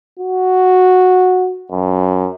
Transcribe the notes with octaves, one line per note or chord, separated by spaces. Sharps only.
F#4
F#2